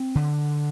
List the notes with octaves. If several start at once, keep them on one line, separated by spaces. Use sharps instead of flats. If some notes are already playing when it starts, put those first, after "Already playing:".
Already playing: C4
D3